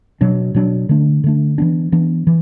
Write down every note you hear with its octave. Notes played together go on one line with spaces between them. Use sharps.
B2 F#3 D4
B2 F#3 D4
D3 A3 D4
D3 A3 D4
E3 B3 D4
E3 B3 D4
E3